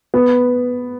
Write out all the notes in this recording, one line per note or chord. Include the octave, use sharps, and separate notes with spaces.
B3